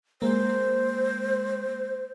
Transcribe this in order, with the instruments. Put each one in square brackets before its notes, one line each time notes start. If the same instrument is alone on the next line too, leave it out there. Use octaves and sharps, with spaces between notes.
[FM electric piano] G#3 A#3 [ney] C5